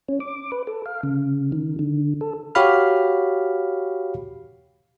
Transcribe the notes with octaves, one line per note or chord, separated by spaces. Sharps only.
C#4
D6
B4
A4
F5
C#3
D#3
D3
A4
F#4 G4 C#5 F5 B5 F6